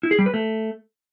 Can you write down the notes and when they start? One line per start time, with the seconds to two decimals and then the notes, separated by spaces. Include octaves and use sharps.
0.03 E4
0.11 G#4
0.19 G3
0.26 B4
0.34 A3